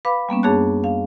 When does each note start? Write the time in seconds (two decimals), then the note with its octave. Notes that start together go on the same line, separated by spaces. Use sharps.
0.05 B4 F5 B5 D6
0.29 G3 A#3 B3 C#4
0.43 F#2 D4 G#4 C#5 A5 F#6
0.84 F5